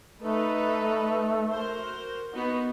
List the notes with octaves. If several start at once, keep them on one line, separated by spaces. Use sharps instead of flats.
A3 D#4 A4 B4
F#4 A#4 C5
B3 D#4 F#4